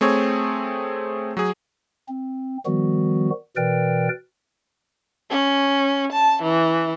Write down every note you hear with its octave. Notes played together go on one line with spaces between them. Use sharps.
A3 C4 G#4 C#5
F#3 G#4
C4
D#3 F3 G3 B3 F#4
B2 E3 A#4 B4 D5 G5
C#4
A5
E3